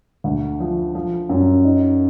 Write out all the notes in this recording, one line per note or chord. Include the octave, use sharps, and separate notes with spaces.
D2
F3
F3
F#2
D#4